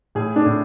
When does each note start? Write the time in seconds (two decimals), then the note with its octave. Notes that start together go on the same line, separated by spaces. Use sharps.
0.15 A2 G#4
0.36 D4
0.46 A2